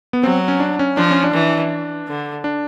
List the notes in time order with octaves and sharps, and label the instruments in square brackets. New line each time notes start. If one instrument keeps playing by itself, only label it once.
[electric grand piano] B3
[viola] F#3 [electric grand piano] C4
[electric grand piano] C#4
D4
C#4
[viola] F3 [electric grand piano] D4
[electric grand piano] C#4
D4
[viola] E3
D3
[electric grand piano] D4